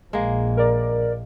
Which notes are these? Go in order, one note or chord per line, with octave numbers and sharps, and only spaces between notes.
A#1 G#3 A#3
A#4 D5